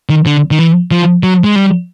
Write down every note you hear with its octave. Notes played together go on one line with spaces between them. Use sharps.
D#3
D3
D#3
E3
F3
F#3
G#3
G3